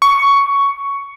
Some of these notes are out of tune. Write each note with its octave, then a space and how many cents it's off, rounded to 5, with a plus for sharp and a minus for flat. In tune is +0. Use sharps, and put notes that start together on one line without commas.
C#6 +10